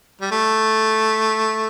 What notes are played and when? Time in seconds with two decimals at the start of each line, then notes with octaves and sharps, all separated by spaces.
0.21 G3
0.31 A3